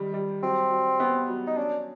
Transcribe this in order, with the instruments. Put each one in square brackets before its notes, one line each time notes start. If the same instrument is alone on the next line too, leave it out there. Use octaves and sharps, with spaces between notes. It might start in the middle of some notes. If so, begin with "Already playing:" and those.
Already playing: [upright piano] D#3 G3
G3
[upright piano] F#3 [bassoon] C4
[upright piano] F#3
B3
F#3
[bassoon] D#4
[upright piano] C#4 [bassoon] D4